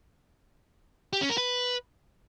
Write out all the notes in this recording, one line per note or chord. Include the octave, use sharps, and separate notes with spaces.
G4
C#4
A#4
B4